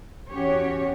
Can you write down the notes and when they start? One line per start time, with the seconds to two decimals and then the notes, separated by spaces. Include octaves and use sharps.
0.32 E2 C#4 F#4 G4 C#5